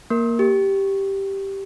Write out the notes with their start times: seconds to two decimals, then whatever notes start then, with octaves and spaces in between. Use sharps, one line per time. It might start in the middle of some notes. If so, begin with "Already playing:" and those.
0.10 A#3 A#4
0.39 G4